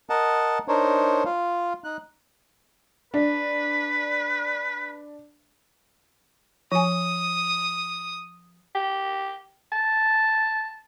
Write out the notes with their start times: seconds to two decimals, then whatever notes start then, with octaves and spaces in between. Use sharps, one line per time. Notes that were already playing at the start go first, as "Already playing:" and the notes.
0.10 A#4 D#5 F#5 A5
0.68 D4 D#4 A#4 C5 C#5
1.25 F4 F5
1.84 D#4 F#6
3.14 D4 B4
6.72 F3 G#5 D#6
8.75 G4
9.72 A5